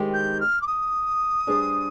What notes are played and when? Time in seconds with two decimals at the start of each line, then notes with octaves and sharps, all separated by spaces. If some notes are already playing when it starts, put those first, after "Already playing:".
Already playing: D#3 G#3 C4 G4
0.13 G6
0.40 F6
0.61 D6
0.67 D#6
1.47 G3 D4 G#4 C5